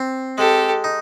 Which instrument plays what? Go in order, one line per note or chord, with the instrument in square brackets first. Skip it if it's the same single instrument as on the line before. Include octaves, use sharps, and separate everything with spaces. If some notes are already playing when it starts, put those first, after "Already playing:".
Already playing: [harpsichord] C4
[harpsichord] G#3 [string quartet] G4 A4
[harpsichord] D#4